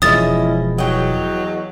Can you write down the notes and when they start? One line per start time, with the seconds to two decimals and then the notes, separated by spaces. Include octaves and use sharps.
0.02 E1 F3 G#3 C#4 E4 D#5 D#6 A6
0.78 E2 F#3 D#5 G5